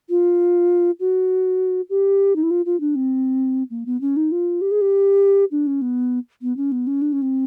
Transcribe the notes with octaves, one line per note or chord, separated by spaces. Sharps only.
F4
F#4
G4
D#4
E4
F4
F4
D4
C4
A#3
B3
C#4
D#4
F4
G4
G#4
G4
D4
C#4
B3
B3
C#4
B3
C#4
D4
C#4
C4